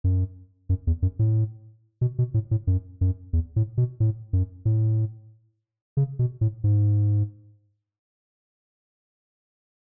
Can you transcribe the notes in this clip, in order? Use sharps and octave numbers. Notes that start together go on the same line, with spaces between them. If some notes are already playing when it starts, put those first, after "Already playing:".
F#2
F#2
E2
F#2
A2
B2
B2
A2
A2
F#2
F#2
E2
A2
B2
A2
F#2
A2
C#3
B2
A2
G#2